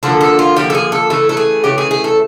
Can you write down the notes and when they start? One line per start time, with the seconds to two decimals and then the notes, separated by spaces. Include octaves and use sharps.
0.03 D3 F3 A#3 A4
0.21 A4
0.39 F4
0.56 D3 F3 A#3 G4
0.70 A4
0.75 G#4
0.92 A4
1.10 C#3 E3 A3 A4
1.29 A4
1.37 G#4
1.64 C#3 E3 A3 G4
1.78 G#4
1.91 G#4
2.04 A4